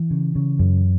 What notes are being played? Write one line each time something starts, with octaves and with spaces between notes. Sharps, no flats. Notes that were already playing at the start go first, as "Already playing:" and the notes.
Already playing: E3
C#3
C#3
F#2